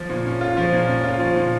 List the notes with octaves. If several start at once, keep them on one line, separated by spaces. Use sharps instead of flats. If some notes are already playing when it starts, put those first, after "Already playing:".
Already playing: F3
A#2
C#4
F4
F3
A#2
C#4
F4
F3
A#2